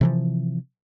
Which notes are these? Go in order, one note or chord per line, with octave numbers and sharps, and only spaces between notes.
C3 E3 F3